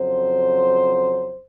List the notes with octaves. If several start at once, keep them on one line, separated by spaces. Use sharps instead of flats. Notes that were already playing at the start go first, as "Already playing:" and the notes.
Already playing: F2 C#3 F#3 C5